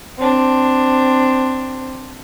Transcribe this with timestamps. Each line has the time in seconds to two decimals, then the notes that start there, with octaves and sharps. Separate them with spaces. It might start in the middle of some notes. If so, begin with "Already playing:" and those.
0.18 C4 D4